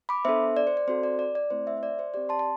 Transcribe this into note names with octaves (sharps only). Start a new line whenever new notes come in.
B5 D6
B3 D4 A4 C5 E5
D5
C5
D5
C4 F#4 A4 C5
D5
D5
D5
A3 C4 E4 C5
C5 E5
C5
D5
C5
C4 G4 D5
A5 C6
A5